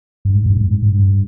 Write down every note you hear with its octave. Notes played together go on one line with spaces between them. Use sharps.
G2
G#2
G2
G#2
G#2
G2